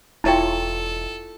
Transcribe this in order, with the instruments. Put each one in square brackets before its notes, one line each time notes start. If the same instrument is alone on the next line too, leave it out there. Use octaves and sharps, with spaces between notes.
[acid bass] E1 [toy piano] E4 E5 G5 [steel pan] F4 C#5 A5 [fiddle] A4